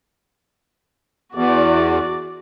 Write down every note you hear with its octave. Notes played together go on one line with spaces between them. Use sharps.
E2 F#4 D5